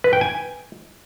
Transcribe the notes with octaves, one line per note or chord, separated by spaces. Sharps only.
B4
G5
G#5